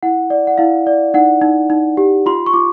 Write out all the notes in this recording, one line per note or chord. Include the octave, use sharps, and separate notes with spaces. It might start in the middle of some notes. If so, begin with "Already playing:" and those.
E4 F#5
D5
F#5
E4 F5
D5
D#4 F#5
D#4
D#4
G4
F4 C6
C#6
F4 D6